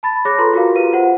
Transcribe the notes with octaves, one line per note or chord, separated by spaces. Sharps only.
A5 B5 A6
G#4 C#5 B5 D6 F#6 A#6
F4 A4 B4 A#5 C6
F4 F#4 G#4 A#4 F5
F4 G4 B4 F5 D#7
F4 C5 F#5